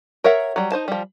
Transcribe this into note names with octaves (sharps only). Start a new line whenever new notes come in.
A#4 C#5 E5 F#5
F#3 G3
D#4 C5 A5
F3 G3